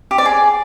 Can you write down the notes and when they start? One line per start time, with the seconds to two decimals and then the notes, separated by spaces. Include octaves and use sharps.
0.11 G4
0.18 D5
0.26 G#4